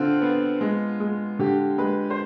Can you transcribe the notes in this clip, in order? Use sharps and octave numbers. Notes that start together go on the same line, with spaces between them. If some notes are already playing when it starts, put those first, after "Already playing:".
Already playing: D3 C4 F4
B3
G#3
G#3
D3 G4
G#3 B4
C5